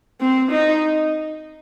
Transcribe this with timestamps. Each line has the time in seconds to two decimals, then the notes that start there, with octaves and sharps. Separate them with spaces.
0.21 C4
0.51 D#4